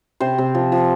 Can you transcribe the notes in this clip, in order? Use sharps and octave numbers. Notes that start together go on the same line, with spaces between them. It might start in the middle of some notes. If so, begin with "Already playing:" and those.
C3 C5
C3
F3
F3